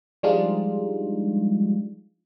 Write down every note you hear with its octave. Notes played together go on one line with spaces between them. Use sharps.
F3 G3 G#3 D4 D#4 F4